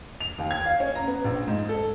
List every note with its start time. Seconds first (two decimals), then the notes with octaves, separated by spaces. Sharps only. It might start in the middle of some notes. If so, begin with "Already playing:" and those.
0.21 F7
0.38 D#2
0.51 G#6
0.65 F5
0.80 C#4
0.95 A#5
1.08 B3
1.25 A#1
1.48 G#2
1.69 A4